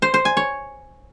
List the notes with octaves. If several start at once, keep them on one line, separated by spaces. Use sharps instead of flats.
C5
C5
G#5
C#5